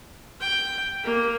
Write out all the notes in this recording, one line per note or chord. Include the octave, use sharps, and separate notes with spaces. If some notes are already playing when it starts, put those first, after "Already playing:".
G5
A#3